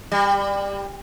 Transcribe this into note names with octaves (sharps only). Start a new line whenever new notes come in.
G3